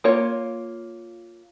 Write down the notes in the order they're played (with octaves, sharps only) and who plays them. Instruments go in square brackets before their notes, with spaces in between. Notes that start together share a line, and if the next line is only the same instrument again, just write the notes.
[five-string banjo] A#3 F4 C#5